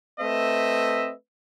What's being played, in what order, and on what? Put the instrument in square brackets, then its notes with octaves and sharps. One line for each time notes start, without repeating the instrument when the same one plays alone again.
[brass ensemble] A3 C4 B4 D#5 E5